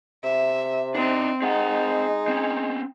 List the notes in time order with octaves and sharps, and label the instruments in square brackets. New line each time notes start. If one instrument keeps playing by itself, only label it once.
[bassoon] C3 [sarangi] E5
[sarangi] C4 [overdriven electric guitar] D4 D#4
[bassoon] G#3 [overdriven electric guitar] C4 F#5 [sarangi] D#4
[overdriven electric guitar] C4 C#4